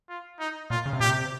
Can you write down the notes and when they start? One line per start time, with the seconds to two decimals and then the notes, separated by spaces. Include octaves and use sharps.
0.09 F4
0.40 D#4
0.70 A#2 F4
0.86 C#3
0.93 C3
1.00 A#2 G4
1.08 C3